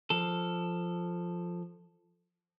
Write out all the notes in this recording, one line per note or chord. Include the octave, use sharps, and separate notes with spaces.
F3 A4